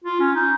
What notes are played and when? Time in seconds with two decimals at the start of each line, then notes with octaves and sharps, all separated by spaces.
0.04 F4
0.20 C#4
0.35 D#4